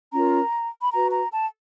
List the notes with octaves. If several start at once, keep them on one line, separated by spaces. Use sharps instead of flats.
C#4 F4 A#4 A#5
B5
F#4 B4 A#5
A#5
A5